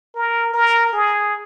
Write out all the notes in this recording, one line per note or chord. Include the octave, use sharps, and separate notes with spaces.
A#4
A#4
G#4